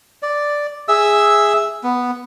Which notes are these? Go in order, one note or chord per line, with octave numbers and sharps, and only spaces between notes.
D5
G#4 E5 E6
B3